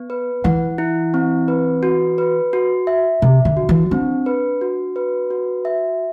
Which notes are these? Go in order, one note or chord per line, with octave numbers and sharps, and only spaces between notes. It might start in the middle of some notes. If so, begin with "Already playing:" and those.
Already playing: B3
B4
E3 F#5
E4
C4
B4
F#4
B4
F#4
E5
C3 E5
D3
F#4
E3
C4 D4
B4
F#4
B4
F#4
E5